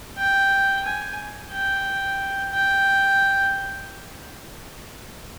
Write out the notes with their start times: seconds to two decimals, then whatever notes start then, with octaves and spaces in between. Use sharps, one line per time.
0.18 G5
0.85 G#5
1.52 G5
2.52 G5